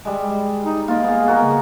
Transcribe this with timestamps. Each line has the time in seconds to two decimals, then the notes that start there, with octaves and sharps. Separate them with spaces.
0.05 G3 G#3
0.65 D#4
0.88 A#3 F4 D#5
1.04 B3 G#4
1.28 F#4 A#4 D#5
1.44 C#3